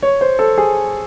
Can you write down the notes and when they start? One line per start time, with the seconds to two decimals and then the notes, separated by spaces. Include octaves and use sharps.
0.02 C#5
0.21 C5
0.39 A4
0.58 G#4